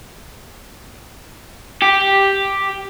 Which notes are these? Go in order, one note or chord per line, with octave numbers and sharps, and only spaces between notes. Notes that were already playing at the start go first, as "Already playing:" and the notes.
G4